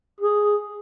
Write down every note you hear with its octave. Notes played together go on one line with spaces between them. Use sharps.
G#4